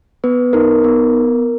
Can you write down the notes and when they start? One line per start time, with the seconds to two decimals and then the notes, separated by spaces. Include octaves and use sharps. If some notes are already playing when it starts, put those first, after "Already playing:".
0.24 B3 B4
0.53 D#4 A#4
0.84 B3